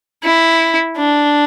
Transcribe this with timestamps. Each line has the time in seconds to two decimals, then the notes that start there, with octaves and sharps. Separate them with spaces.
0.24 E4
0.98 D4